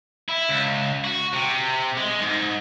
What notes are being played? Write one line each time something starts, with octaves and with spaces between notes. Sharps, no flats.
E4
C#2
F#4
C3
G#3
G#2